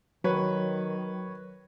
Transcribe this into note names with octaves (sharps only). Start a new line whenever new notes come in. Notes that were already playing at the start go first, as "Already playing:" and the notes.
D#3 F#3 B4 C#5